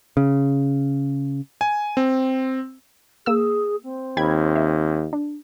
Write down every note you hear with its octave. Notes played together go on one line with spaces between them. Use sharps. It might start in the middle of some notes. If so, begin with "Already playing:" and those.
C#3
G#5
C4
A#3 G#4 E6
C4
D#2 G5 B5 G#6
E5
D4